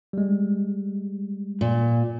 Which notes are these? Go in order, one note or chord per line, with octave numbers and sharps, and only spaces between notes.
G3 G#3
A#2